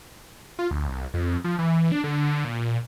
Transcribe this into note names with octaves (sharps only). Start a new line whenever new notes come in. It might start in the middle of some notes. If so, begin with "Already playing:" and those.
F4
D2
C2
F2
F3
E3
D4
D3
A#2